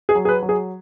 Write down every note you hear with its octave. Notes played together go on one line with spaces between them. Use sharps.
G#4
F#3
G#4
B4
F#3
G#4